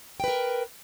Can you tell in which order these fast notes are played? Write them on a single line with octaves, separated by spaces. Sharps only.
G5 B4 A#4